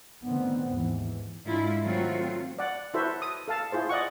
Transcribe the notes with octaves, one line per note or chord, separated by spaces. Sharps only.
D3 D#3 A3 B3 C4
D#2 G#2 E3
G#2 D3 G#3 E4 F4
D#3 F#3 A3 C4 F4 F#4
D5 F#5
E4 F#4 A4 B4 C5 E5
D#6
A4 F5 A5
E4 F4 G#4 C5
D5 D#5 F#5 C#6